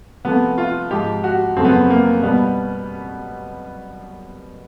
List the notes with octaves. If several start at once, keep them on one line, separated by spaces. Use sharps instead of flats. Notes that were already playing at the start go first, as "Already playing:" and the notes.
C3 F3 A3 B3
F4
G#2 F3 G#3 G4
F#4
F#2 C#3 F3 A3 C4
B3
C4
A#3
B2 G3 B3